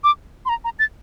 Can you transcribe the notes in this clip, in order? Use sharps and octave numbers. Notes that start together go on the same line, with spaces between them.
D6
C6
A#5
A#5
A6